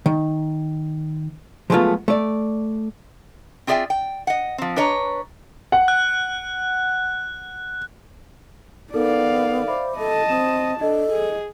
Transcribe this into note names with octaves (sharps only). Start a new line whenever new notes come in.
D#3
F3 F#3 G#3 A3 B3 F4
A3 D5
C4 F4 G#4 D5 E5 G5
G5
D#5 F#5
F3 C4
D4 B4 C#5 D#5 A#5
F#5
F#6
B3 D#4 A4 A#4 D5 F5
C5 E5 B5 D6
A4 D#5 A5
C4 D#6 E7
D4 A4 D#5
G#4